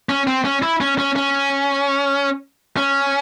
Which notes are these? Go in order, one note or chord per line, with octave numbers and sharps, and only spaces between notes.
C#4
C4
C#4
E4
C#4
C#4
C#4
C#4